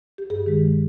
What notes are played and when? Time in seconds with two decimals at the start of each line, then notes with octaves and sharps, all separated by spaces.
0.18 G4
0.30 G2 G#4
0.46 D#3 G#3